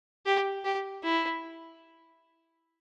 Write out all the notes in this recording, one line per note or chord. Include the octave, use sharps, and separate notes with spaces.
G4
G4
E4